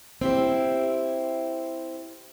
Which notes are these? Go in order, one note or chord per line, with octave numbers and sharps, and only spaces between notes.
C4 E4 G4